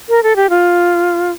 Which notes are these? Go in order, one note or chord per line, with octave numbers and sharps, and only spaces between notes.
A#4
A4
G4
F4